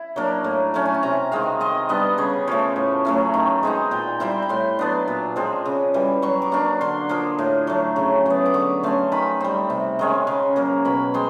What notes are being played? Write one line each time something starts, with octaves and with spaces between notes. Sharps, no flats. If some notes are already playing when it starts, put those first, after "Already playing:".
Already playing: E4
F#3 A#3 D4
A2
F#3 A3 C#4
G#5
A5
C3 A#5
D#3 G#3 C4 F5
D#3 D#5
G3 B3 D4 D#5
C#3 C#5
F3 A3 C#5
A2
F#3 A3 C#4
D#3
G#3 C4 D#4
A#2 G5
G3 C4 E4 G5
B5
A2 C6
F#3 B3 D4
A#2
F3 G#3 C4
C#3
E3 G3
F#3 C#6
D6
A#3 D4 C#6
D3 C6
F3 A#3 D6
A2
F#3 A3
C#3
F#3 B3
D6
D3 C#6
F#3 A3 C#4 C6
D#3 B5
G3 C4
C3
D#3 G#3 C#4
C#3
F#3 A#3
B2 B5
G#3 C4 C6